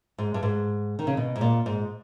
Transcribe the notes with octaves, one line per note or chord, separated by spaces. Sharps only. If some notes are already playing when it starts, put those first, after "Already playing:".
G#2
G2
G#2
D#3
C#3
B2
G#2
A#2
G#2